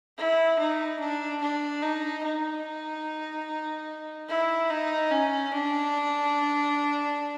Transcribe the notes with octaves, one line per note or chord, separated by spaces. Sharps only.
E4
D#4
D4
D4
D#4
D#4
E4
D#4
C#4
D4